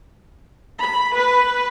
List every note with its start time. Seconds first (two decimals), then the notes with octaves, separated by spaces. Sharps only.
0.82 B5
1.17 B4